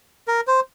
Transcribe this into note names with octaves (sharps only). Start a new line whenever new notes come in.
A#4
C5